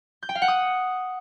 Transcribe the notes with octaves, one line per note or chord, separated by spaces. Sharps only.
G6
G5
F5
F#5
D#6